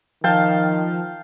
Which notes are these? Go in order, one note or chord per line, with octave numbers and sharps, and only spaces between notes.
D#3 F3 F5 G5 A5